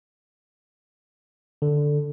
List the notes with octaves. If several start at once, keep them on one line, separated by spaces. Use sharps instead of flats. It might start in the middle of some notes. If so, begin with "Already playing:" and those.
D3